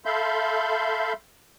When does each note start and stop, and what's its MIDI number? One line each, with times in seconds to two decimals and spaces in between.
0.05 1.13 69
0.05 1.13 76
0.05 1.13 77
0.05 1.13 83
0.05 1.13 84
0.05 1.13 91